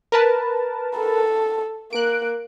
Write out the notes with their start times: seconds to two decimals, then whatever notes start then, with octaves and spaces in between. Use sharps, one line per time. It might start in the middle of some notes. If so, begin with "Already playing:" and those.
0.12 A#4 B4 A5
0.98 A4
1.93 A#3 F#6 D7